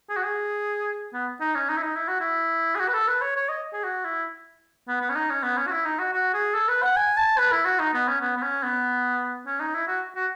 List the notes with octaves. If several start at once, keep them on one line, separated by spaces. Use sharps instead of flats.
G#4
F#4
G#4
B3
D#4
C#4
D#4
E4
D#4
E4
F#4
E4
G#4
F#4
B4
A4
B4
C#5
C#5
D#5
G#4
F#4
E4
B3
B3
C#4
D#4
C#4
B3
C#4
F#4
E4
D#4
F#4
F#4
G#4
A4
B4
F#5
G#5
A5
B4
E4
F#4
D#4
B3
C#4
B3
B3
C#4
B3
C#4
D#4
E4
F#4
F#4